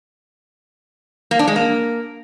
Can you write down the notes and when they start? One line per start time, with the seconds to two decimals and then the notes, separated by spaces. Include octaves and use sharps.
1.31 A#3
1.39 D4
1.48 G#3
1.56 A#3